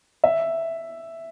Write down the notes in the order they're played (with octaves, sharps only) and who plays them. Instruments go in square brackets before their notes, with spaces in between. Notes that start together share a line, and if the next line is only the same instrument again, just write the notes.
[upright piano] E5